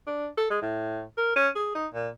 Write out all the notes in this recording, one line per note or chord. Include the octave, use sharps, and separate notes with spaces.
D4
A4
G#3
A2
A#4
C#4
G#4
D#4
A#2